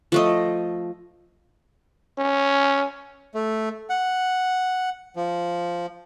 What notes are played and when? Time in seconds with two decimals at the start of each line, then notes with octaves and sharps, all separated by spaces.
0.12 F3 A3 D#5
2.19 C#4
3.34 A3
3.90 F#5
5.16 F3